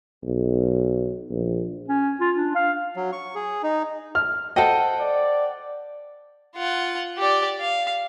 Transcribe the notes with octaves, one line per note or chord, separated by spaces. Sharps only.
B1
A#1
C#4
F4
D4
F5
F#3
C#6
G#4
D#4
F6
A4 C5 D#5 F#5 G5
D5
F4 F#5
G4 D5
F5